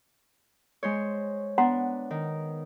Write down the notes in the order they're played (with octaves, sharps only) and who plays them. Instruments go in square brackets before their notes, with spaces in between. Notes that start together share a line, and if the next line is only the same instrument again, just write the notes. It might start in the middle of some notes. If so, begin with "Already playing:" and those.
[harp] G#3 C5 C#5
[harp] B3 D4 [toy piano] F#5 A#5 C6
[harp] D#3